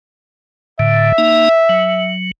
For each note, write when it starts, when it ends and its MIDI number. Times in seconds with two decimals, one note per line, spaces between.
0.79 1.12 45
0.79 1.12 50
0.79 2.13 76
1.18 1.49 58
1.18 1.49 63
1.69 2.31 54